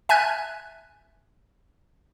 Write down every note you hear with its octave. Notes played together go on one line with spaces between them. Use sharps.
E5 G#5 A5 F6 F#6 G#6